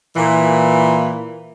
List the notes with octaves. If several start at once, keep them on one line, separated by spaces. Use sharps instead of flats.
A#2 E3